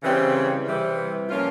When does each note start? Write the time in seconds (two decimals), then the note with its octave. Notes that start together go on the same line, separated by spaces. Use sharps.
0.03 C#3 E3 G3 C4
0.66 C3 E3 G3
1.28 A#2 F3 A#3 C#4 F4